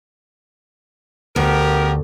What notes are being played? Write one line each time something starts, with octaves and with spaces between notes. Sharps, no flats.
D2 B3 G4 A#4